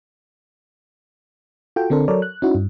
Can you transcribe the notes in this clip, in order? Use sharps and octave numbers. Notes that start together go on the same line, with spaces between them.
F4 F#4 A4 G5
D3 C4 D4 A4 A#4 C5
F#3 A4 A#4 C#5 D5
F#6
C#4 D#4 E4 F#4
G2